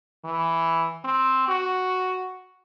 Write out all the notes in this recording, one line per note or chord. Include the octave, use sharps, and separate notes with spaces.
E3
C4
F#4